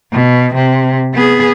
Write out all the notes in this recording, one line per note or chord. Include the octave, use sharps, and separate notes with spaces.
B2
C3
B3 G#4